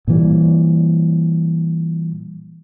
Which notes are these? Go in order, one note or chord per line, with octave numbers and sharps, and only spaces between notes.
A#2 E3 G3